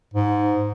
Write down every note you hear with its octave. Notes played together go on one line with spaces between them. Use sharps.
G#2